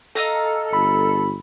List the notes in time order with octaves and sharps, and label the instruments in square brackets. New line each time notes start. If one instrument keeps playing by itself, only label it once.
[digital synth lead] A4 [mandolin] D#5 F5 A#5
[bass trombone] G1 [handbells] B5